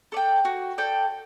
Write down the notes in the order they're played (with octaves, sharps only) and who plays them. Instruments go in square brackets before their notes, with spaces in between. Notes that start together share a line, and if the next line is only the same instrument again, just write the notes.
[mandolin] A4 D5 G5
F#4
A4 D5 G5